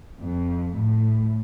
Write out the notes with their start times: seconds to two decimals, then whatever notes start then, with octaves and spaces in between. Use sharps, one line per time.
0.22 F2
0.77 A2